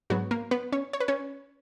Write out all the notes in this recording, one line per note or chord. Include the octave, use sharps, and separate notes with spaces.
G#2 F#3 B3 F#4
A#3 A#4
B3 B4
C#4 C#5
C#5
B4
C#4 C#5